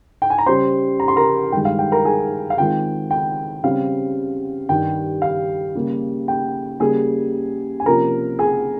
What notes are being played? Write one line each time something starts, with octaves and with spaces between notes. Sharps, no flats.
G5
G#5
A#5
C#3 G3 C#4 C5 C6
A#5
C6
A#4 A#5
G2 D#3 G#3 G5
F5
G5
A#4 A#5
G#4 G#5
F5
D#3 G#3 C4 F4 G5
G5
C#3 G3 C4 F5
G2 D#3 G3 G5
F5
C#3 G3 A#3
G5
C#3 G3 A#3 G#4 G#5
G#5
C3 F3 A#3 C#4 F4 A#4 A#5
G#4 G#5